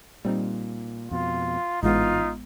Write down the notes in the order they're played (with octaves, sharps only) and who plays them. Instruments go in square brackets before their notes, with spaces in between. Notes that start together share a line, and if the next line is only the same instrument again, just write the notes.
[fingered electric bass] A#2 [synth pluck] G3 C4 D#4
[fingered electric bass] F2 B2 [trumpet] F4
[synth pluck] A1 G#3 B3 [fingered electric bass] G#2 E3 [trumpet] D#4 [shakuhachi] F4